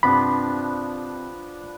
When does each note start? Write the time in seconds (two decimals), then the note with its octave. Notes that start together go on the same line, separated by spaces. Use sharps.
0.03 G2 C3 F3 B3 D4 B5